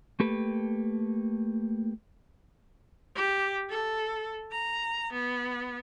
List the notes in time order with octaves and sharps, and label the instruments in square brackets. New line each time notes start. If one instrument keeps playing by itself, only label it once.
[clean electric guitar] A3 A#3 G4 A4 B4
[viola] G4
A4
A#5
B3